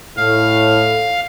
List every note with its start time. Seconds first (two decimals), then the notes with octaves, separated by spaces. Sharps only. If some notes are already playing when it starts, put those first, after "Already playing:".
0.17 A2 F5